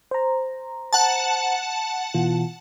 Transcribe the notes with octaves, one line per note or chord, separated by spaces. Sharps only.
C5 A#5
F#5 A5
B2 E3 F4